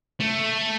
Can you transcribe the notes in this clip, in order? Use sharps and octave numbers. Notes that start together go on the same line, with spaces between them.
A3